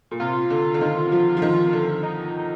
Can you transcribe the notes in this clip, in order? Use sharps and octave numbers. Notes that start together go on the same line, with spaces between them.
A#2
C3 F4
D3
D3
D#3
F3
F3
D#3
D3
D#4